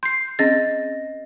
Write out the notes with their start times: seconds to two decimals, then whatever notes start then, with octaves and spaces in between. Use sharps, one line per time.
0.03 C6 G6 C7
0.39 C4 C#4 G#4 D#5 A6